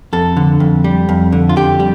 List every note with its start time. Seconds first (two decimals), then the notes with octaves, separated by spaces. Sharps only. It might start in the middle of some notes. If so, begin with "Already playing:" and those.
0.13 F2 A4
0.37 D3
0.60 F2
0.84 G3
1.09 F2
1.32 D3
1.49 F4
1.56 F2 G4
1.80 G3